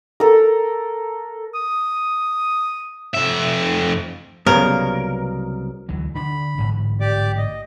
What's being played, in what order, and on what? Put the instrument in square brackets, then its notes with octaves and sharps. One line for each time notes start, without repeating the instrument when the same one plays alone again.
[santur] A4 A#4
[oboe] D#6
[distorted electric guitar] F2 E5
[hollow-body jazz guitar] C2 F#3 B3 [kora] C#3 G3 A#3 [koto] A#4
[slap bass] D2 E3 F#3
[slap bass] D3 D4 [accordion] B5
[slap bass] A1 G#2 D3
[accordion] G4 D5 D6
D#5